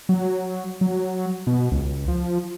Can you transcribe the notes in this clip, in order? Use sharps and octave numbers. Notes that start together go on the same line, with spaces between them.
F#3
F#3
B2
C#2
F3